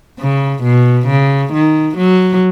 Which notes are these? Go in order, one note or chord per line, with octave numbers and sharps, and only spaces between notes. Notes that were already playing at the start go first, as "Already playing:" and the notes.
C#3
B2
C#3
D#3
F#3